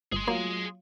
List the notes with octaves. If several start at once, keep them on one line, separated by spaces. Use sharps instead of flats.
G1 G#4 C6
F#3 A#3 F4